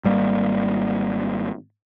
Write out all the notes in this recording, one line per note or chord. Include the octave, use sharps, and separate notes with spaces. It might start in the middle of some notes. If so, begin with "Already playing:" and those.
G#1 G3 A#3